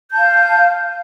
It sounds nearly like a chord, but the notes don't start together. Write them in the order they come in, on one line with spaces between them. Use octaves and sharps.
G6 A5 F5